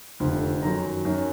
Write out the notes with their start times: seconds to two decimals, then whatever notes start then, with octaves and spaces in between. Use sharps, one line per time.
0.20 F1 F2 D3 F3
0.63 F#2 D#3 F#3 A#5
1.05 F#2 D#3 F#3